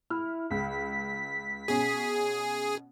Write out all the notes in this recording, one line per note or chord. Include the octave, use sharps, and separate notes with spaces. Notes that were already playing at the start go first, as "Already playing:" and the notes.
E4 F6
C#2 B6
B2 C#4 G#4